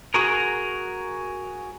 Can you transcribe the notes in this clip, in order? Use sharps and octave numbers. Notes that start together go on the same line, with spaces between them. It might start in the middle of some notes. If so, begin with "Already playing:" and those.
F#4 G#4 A#4